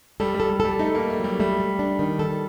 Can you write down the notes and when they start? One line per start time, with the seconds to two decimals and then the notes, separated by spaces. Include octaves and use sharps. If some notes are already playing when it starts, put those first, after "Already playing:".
0.20 G3 A4
0.34 G3
0.40 A4
0.50 G3
0.60 G3 A4
0.79 A3 D#4
0.95 A#3
1.00 D#4
1.10 A3
1.20 F#3 G3
1.40 G3 A3
1.60 A3
1.79 D4
1.99 D#3
2.19 A4